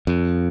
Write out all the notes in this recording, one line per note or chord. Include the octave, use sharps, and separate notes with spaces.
F2